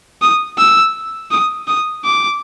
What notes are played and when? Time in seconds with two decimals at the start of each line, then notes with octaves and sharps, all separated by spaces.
0.21 D#6
0.58 E6
1.31 D#6
1.67 D#6
2.05 D6